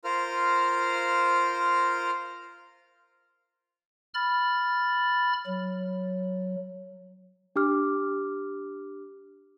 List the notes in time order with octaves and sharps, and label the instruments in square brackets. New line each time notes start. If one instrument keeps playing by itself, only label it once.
[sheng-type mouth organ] F4 A#4 C5 F6
[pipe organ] B5 F6 A6
F#3
[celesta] D4 G4 D6 F6